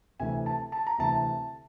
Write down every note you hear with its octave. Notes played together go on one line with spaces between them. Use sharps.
D2 C3 E3 A3 G#5
A5
A5
A#5
D2 C3 E3 A3 A5